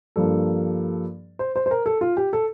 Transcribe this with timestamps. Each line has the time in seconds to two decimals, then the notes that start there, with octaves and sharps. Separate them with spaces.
0.16 G2 F3 A#3 A4
1.39 C5
1.56 C5
1.66 C5
1.71 A#4
1.86 A4
2.01 F4
2.17 G4
2.33 A4